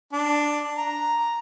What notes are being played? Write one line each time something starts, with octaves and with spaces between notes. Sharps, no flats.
D4
A#5